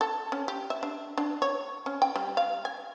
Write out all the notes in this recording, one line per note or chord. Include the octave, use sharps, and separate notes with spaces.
A4
C#4
G4
E5
D4
D4
C#5
C#4
G5
G3
F5
G#5